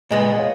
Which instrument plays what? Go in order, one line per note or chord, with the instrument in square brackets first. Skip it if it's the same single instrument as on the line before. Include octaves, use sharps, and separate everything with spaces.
[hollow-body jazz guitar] A#2 G#3 B3 [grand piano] D#5
[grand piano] C#5 F5